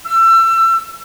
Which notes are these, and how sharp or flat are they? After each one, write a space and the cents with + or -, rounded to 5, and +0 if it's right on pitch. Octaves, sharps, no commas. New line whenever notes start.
E6 +30